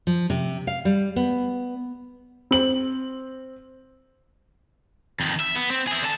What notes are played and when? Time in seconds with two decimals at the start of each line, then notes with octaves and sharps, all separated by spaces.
0.07 F3
0.30 C3
0.67 F5
0.85 G3
1.16 B3
2.51 C4 F#7
5.20 F2 D#3
5.40 E5
5.56 B3
5.70 C4
5.87 E4 G#4
6.02 D3 A5